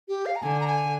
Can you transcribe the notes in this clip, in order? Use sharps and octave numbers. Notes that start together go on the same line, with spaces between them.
G4
F5
A#5
D3 G#5
A#5
G#5